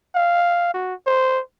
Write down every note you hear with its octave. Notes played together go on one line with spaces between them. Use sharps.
F5
F#4
C5